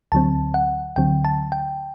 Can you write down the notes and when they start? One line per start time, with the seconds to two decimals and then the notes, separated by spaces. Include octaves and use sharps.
0.12 D2 D3 F#3 C4 A5
0.54 F#5
0.96 D2 D3 F#3 C4 G5
1.25 A5
1.52 G5